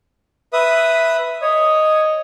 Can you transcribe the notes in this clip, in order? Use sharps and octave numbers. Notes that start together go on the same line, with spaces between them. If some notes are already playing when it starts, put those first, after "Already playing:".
B4 E5 D#6
C#5 D#5